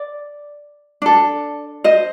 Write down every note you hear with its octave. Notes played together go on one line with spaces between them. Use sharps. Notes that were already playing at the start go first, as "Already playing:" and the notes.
Already playing: D5
D4 A4
C5 D#5